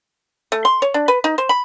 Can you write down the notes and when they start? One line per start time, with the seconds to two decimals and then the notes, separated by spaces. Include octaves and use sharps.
0.52 A3
0.65 C6
0.82 C#5
0.94 D4
1.08 B4
1.24 D#4
1.38 C5
1.49 B5